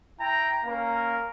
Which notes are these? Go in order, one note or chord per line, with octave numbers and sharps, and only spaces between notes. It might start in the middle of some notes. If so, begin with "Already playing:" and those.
E4 G5 A#5
A#3 C#4 A#4